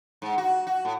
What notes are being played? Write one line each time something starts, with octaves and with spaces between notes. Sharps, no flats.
G#2
F#4
F#4
A2